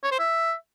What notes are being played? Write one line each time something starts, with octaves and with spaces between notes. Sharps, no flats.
C#5
C5
E5